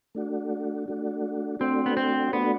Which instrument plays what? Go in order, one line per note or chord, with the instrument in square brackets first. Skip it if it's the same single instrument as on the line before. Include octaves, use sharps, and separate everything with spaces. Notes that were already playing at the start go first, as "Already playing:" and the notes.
[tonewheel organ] A3 D4 F#4
A3 D4 F#4
[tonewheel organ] A3 D4 F#4 [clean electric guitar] C4
[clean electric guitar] B3
C4
[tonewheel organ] A3 D4 F#4 [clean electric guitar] B3